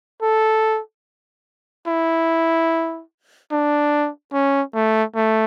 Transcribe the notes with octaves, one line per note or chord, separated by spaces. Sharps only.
A4
E4
D4
C#4
A3
A3